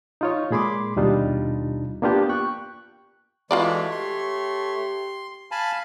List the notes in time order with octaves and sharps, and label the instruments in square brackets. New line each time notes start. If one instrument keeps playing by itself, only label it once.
[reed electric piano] D#4 F4 C#5
A#2 G#3 G#4 B5 C6 D6
D#2 B2 G3 D4 D#4 F4
A#3 B3 D4 F4 G4
G5 C#6 F#6
[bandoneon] E3 G#3 [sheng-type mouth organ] A3 C#5 [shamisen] F4 F#4 D5
[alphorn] G4 [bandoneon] C6
[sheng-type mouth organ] F5 [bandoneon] G#5 A5 B5